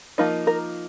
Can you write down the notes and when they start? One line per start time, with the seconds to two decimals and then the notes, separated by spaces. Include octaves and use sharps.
0.18 F3 A#3 D#4
0.47 A#4